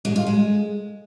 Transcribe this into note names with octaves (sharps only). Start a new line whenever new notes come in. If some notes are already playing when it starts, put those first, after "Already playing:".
G#3
F4
G#3